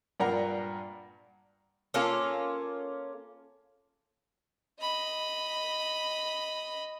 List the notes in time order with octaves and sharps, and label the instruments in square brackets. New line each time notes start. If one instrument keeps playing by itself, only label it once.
[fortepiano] G2 A#2 A#4 F#5 A#5
[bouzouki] A#3 C#4 F4 A4
[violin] D#5 B5